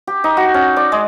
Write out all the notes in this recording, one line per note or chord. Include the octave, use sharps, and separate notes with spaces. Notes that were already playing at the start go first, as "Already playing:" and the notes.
G4
D#4
F#4
C#4
D5
G#3